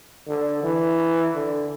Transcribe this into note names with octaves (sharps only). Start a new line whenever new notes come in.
D3
E3
D3